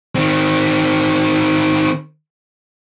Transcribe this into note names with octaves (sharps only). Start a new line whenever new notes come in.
D#3 C4